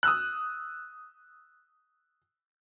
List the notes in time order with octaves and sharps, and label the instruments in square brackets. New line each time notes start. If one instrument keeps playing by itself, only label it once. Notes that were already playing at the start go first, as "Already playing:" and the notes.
[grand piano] D#6 E6 F#6